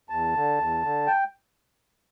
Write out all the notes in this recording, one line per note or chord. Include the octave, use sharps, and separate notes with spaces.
E2 A5
D3
E2
D3
G5